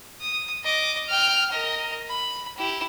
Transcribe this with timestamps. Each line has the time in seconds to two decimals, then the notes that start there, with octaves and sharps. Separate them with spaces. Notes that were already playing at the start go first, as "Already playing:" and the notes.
0.21 D#6
0.64 D#5 D6
1.08 G5 F6
1.51 A#4 D#5
2.09 B5
2.58 E4 G4